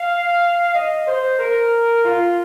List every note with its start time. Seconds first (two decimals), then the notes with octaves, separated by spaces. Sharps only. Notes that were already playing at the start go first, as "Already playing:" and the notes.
Already playing: F5
0.75 D#5
1.07 C5
1.39 A#4
2.04 F4